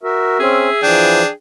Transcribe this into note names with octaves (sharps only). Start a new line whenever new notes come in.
F#4 A#4 E5
C4 C#4 G#4
E3 F3 D4 G5